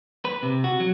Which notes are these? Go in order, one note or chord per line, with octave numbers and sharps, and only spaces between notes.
B4
C3
F#4
F#3